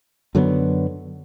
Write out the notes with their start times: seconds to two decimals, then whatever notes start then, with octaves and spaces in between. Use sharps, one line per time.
0.35 F#2 D3 F#3 B3